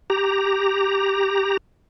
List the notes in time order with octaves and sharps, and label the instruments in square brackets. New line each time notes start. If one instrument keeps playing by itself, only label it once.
[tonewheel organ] G4 A#5